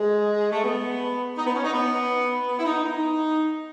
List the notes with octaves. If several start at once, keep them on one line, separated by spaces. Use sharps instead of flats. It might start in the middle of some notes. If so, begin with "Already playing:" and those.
Already playing: G#3
A3
B3
D#4
B3
C#4
D#4
B3
B3
E4
D#4
D#4